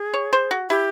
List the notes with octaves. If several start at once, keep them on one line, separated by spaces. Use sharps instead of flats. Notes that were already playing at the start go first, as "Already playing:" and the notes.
Already playing: G#4
C#5
C5
F#4
E4 G4